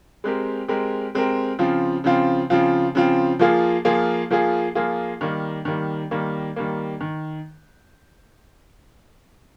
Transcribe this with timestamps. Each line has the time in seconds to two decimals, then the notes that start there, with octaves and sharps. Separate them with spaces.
0.24 G#3 C4 G4 A#4
0.68 G#3 C4 G4 A#4
1.15 G#3 C4 G4 A#4
1.59 C#3 F3 C4 F4
2.04 C#3 F3 C4 F4
2.50 C#3 F3 C4 F4
2.95 C#3 F3 C4 F4
3.39 F3 A#3 F4 G#4
3.85 F3 A#3 F4 G#4
4.30 F3 A#3 F4 G#4
4.75 F3 A#3 F4 G#4
5.21 D#3 G3 A#3
5.65 D#3 G3 A#3
6.11 D#3 G3 A#3
6.56 D#3 G3 A#3
7.01 D#3